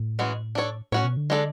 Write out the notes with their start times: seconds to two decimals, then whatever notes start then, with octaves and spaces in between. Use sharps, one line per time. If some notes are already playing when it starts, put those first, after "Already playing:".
Already playing: A2
0.19 E3 G#3 C#4 F#4
0.55 D4 A4 C#5
0.92 A2 C#4 F#4 C#5
1.04 B2
1.17 D3
1.30 G#3 D4 A4